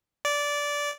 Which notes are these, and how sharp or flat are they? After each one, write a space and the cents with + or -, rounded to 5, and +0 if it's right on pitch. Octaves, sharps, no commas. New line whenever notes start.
D5 -15